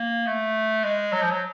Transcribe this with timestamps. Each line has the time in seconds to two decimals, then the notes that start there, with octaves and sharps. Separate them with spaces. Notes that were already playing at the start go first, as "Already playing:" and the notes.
Already playing: A#3
0.26 A3
0.83 G#3
1.12 F#3
1.22 F3
1.31 F#3